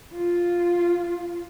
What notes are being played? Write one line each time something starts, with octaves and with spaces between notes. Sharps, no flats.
F4